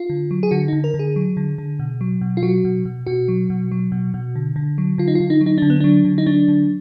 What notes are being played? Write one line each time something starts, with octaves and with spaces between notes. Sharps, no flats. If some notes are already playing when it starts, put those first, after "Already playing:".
Already playing: F4
D3
F#3
G#4
D3 F#4
D3 D#4
A#4
D3
G#4
F#3
D3
D3
B2
F#3
B2
F4
F#3 F#4
B2
B2
B2 F#4
F#3
B2
F#3
B2
B2
D3
D3
F#3
D3 F4
D#4
D3 F4
D#4
F#3
D#4
D3 D4
B3
F#3 D4
D3
D#4
F#3 D4
D3